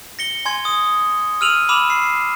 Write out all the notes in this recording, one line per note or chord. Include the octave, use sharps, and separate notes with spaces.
A#6 C#7 G7
G#5 C6 G#6
D#6
E6 F6 D#7 F7 F#7
B5 D6 E6 E7 F7
C7